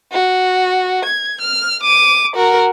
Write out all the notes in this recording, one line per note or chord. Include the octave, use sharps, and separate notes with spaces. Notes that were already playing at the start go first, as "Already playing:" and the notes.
F#4
G#6
F6
D6 D#7
F#4 A#4